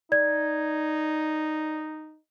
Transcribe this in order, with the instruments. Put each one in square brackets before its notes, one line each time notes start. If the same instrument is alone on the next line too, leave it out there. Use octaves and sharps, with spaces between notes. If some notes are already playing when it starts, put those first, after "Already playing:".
[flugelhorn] D#4 [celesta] D5 G#6